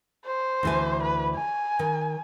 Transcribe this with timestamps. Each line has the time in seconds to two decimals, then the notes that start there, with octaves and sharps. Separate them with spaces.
0.25 C5
0.63 D2 E3 G#5
1.03 B4
1.35 G#5
1.79 D#3